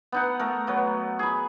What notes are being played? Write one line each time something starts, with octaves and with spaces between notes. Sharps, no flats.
B3 D#4 F#5
A3 A#4
F#3 B3
G#4 B5